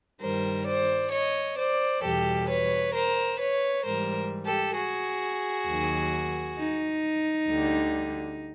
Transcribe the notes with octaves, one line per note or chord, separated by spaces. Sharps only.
G2 D#3 G3 A#4 C5
C5 D5
C#5 D#5
C5 D5
E2 B2 G3 G4 A4
B4 C#5
A#4 C5
B4 C#5
G#2 E3 G3 A#4 C5
G4 A4
F#4 G#4
D#2 D#3 F#3
D#4
D2 D3 G3